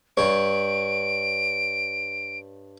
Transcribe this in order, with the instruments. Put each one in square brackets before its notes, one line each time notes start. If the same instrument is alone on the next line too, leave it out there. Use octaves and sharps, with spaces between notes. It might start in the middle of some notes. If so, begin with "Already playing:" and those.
[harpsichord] G2 C#5 [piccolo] D7